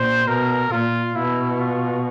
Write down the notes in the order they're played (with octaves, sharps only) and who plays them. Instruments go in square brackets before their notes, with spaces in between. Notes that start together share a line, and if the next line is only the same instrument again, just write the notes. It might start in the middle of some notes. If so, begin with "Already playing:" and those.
Already playing: [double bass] A#2 [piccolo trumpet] C5
[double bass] B2 [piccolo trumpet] A#4
[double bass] A#2 [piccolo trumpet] F4
[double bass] B2 [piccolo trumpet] E4
[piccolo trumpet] F4